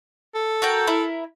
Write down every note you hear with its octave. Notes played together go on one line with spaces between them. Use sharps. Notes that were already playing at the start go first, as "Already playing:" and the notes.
A4
F#4 A#4 G5
E4 A#4